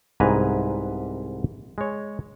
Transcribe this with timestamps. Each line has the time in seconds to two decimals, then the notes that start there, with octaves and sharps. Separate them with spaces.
0.20 C2 G#2 B3 B4 G#5 A#5
1.78 G#3 C#5